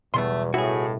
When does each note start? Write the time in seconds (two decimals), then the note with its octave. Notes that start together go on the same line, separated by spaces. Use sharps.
0.14 E2 B2 G3 A3 B3 C6
0.54 C#2 A2 E4 F#4 G#4